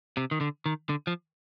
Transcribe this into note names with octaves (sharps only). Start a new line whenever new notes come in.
C3
D#3
D3
D#3
D3
F3